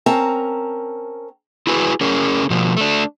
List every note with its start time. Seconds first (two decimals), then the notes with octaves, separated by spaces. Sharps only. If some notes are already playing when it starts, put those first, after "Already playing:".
0.06 C4 C#4 A#4 A5 A#5
1.67 E4 F#4 G#4 B4
2.01 C#4 G#4 A#4
2.50 B2 F3
2.77 A3 D4